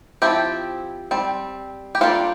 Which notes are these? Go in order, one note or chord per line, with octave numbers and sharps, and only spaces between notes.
F3 C4 E4 G4
G3 C4
G4
G3 A#3 D4 F4 A4